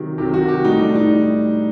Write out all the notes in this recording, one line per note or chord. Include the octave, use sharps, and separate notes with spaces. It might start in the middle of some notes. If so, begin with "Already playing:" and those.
Already playing: C3 D#3 F#3
C3 D#3 F#3 G4
F#4
G4
A2 G3 D#4
D4
D#4